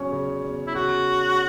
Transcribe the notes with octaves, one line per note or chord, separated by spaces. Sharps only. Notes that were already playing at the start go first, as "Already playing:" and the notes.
Already playing: E2 C#3 F#3 C#4
C#3
E2
E4
C#3 F#4